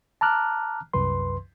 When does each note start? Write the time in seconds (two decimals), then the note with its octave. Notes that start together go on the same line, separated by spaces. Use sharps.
0.21 A5 A#5 D6 F6 F#6
0.93 C2 F#2 B4 C6